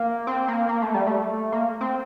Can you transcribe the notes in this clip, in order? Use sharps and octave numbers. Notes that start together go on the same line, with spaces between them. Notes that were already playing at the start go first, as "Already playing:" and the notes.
Already playing: A#3
C4
A#3
A#3
A3
G3
A3
A#3
C4